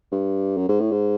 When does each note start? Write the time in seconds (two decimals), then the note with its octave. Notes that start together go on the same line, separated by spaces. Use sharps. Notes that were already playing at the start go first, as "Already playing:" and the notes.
0.12 G2
0.57 F#2
0.69 G#2
0.80 A2
0.91 G#2